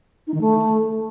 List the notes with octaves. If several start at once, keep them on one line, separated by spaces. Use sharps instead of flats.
D#4
D#3
A3